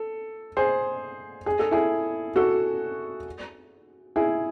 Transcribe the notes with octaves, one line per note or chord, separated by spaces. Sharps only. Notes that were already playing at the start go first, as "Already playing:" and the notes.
Already playing: A4
G#4 C5
G#4
A4
E4 G#4
F#4 A4
E4 G#4